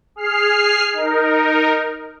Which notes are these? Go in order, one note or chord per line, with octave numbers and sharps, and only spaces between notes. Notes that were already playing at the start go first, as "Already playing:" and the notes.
G#4 F6 C7
D#4 A#4